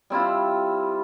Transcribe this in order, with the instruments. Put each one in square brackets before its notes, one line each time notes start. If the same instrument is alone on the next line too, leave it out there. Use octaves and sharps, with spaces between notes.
[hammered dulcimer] G3 C4 E4 F4